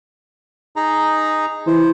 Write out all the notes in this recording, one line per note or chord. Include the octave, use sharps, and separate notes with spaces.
D#4 G#4 A#5
E3 C5